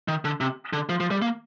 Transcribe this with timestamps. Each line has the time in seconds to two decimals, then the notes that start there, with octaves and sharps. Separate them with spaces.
0.08 D#3
0.25 D3
0.41 C3
0.73 D3
0.89 F3
1.00 F3
1.11 G3
1.22 A#3